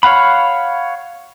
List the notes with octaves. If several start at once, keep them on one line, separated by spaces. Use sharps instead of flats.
C#5 F5 F#5 B5